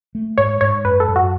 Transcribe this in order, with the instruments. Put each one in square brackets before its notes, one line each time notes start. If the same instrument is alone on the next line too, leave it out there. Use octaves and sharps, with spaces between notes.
[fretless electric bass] A3
[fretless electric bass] G#2 [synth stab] C#5
[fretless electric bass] G#2 [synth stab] C#5
[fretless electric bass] F#2 [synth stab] B4
[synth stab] A4
[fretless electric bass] F#2
[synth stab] F#4